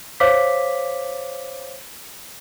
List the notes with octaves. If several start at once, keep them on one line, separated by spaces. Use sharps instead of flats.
C5 C#5 F5 D6 B6